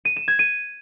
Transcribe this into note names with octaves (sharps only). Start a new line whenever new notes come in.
D#7
E7
G#6
D#7